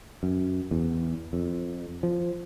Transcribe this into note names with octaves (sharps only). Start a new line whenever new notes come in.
F#2
E2
F2
F3